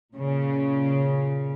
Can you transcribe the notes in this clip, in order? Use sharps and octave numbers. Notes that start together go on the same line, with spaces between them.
A#2 C#3